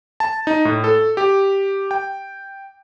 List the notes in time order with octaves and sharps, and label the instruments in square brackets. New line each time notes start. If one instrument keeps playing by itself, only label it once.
[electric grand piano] A5
D#4
A2
A4
G4
G5